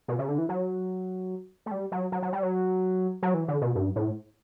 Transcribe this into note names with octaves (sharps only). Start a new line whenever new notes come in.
B2
C#3
D3
E3
F#3
A3
G3
F#3
F#3
F#3
G3
F#3
F#3
E3
D3
B2
G2
A2